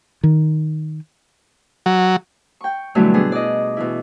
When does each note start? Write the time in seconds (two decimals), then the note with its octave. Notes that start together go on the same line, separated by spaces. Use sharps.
0.23 D#3
1.86 F#3
2.61 G5 C#6
2.95 G2 B2 D3 E3 F#3 A3
3.14 B3 D4 E4 G#4
3.32 D5 D#5
3.77 B2 E3 E4